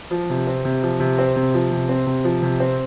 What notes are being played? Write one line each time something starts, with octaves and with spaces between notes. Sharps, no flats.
F3
C3
C4
C3
F3
C3
C4
C3
F3
C3
C4
C3
F3
C3
C4